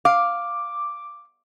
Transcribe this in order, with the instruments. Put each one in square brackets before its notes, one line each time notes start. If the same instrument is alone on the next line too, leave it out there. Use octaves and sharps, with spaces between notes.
[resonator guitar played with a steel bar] F5 [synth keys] D6